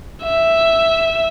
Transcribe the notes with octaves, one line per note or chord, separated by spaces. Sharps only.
E5